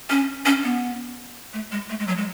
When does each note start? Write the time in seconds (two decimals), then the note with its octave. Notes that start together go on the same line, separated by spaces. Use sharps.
0.10 C#4
0.46 C#4
0.64 B3
1.53 A3
1.72 G#3
1.90 A3
1.99 G#3
2.08 F#3
2.17 G#3